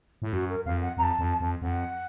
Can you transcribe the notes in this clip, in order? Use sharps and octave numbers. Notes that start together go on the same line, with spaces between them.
A2
F#2 F#4
A#4
F2 F5
F#5
F2 A#5
A5
F2
F2
F2 F#5